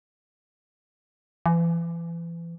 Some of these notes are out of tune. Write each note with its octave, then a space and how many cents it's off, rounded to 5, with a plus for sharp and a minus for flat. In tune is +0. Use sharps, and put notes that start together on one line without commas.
E3 +35